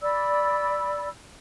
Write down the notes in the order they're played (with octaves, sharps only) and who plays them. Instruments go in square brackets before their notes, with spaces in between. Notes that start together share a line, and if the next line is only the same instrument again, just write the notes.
[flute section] D5 B5 E6